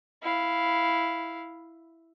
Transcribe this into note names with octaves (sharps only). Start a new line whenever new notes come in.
E4 F5